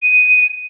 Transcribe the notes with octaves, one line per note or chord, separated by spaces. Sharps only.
D#7